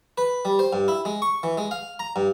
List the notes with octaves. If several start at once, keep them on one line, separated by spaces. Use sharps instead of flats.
B4
G3
C5
G2
E4
G#3
C#6
E3
G#3
F5
A#5
G2